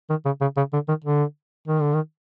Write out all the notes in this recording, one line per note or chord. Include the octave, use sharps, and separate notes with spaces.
D#3
C#3
C#3
C#3
D3
D#3
D3
D#3
D3
D#3